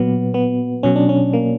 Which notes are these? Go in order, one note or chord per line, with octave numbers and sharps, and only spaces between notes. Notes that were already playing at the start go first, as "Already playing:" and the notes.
Already playing: A#2 F#3 B3
B3
B2 F#3 C#4
D4
C#4
A#3